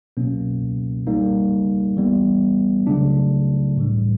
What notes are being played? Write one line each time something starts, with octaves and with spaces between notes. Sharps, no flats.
B2 F#3 A#3 C#4
G3 A#3 D#4
E3 G3 B3
C#3 F#3 A3 D4
A2 E3 G3